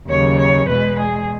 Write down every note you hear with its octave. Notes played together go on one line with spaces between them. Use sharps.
D#2 C#3 F#3 C#5
C#5
E2 B2 G#3 B4
G#4